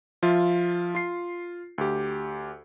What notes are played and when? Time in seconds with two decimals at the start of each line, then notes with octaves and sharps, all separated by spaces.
0.23 F3 F4 E5
0.95 F4 C7
1.78 D2 G4